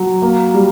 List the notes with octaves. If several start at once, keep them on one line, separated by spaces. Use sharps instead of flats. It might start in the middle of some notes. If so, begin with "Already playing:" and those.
Already playing: F#3
A#3
G3